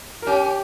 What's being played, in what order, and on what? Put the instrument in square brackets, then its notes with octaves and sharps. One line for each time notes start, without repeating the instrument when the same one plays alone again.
[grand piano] A#4
[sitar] C#4 [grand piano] G4